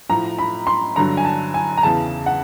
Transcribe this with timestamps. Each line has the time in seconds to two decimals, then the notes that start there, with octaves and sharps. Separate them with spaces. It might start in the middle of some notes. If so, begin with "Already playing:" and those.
0.10 A2 F3 A#5
0.39 B5
0.67 C6
0.96 G2 D3 F#3 A#5
1.17 G#5
1.25 A5
1.54 G#5
1.77 A#5
1.83 E2 C#3 E3 A5
2.26 F#5